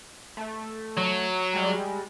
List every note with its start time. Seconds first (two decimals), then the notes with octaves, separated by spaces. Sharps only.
0.37 A3
0.97 F#3
1.53 G3 G#3